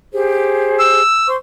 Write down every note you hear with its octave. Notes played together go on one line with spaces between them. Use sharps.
G4 G#4 C5
E6
C5 C6 C#6